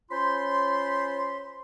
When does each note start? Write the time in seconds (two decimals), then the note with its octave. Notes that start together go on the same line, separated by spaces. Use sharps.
0.11 C#4 F4 C5 B5 C6